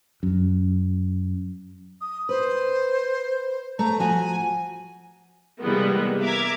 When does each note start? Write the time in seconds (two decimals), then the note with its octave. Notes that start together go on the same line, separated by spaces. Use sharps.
0.23 F#2
2.01 D#6
2.29 B4 C5
3.79 A3 A#5
4.00 F3 F#4 F#5 G#5
5.60 C3 E3 G3 G#3 A#3 B3
6.21 A#4 E5 D6 G#6